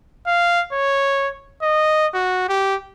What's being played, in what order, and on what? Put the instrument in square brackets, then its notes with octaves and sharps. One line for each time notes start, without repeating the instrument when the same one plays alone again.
[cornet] F5
C#5
D#5
F#4
G4